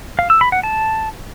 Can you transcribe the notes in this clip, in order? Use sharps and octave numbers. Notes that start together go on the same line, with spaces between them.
F5
E6
B5
F#5
A5